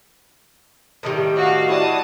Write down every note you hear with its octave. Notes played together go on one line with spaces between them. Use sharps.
A2 D#3 G3
F#4 F5
E4 F#4 D5 A5 D#6